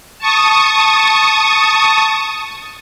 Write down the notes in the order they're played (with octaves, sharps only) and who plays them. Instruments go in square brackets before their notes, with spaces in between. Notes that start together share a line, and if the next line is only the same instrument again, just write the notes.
[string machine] A5 C#6 D#6